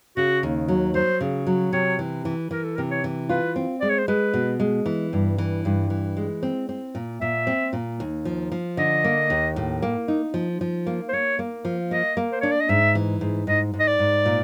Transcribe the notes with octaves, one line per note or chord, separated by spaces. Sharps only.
C#3 F#4
D#2
F#3
F#3 C5
C#3
F#3
C3 C#5
E3
E3
E3 A#4
A4
C3 A#4
C#5
E3
F4 B4
C4
G#3 D5
C#5
C5
G#3 B4
B2
G#3
E3
G2
E3
G2
E3
G#3
C4
C4
A#2
A#2 E5
C4
A#2
D#2
F3
F3
D3 D#5
A#3
D#2
A2
A#3
D#4
F3
F3
A#3
C5
A#3 C#5
A#3
F3
A#3 D#5
A#3
C5
D4 C#5
D5
D#5
G#2 E5
E3
G#2
G#2 D#5
G#2
D#5
D5
G#2
A#2